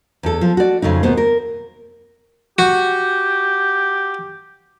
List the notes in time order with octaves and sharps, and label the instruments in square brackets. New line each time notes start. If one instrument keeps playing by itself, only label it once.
[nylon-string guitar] E2 A4
F3
F#4 D5
F2 C#3 A3 D#4
D#2 B2 B3 C5
A#4
[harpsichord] F#4 [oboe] G4